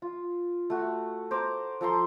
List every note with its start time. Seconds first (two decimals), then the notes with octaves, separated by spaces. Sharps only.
0.02 F4
0.70 A3 F#4
1.31 C5 A#5 D6
1.81 F3 A4 A#5 C6